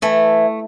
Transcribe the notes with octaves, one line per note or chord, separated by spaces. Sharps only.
E3 A3